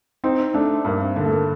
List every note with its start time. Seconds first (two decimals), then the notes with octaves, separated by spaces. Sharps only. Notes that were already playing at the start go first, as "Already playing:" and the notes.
0.24 C4 D#4
0.54 A3 D4
0.85 G2 A#3
1.00 C4
1.16 D3 A#3
1.25 A3
1.31 A#3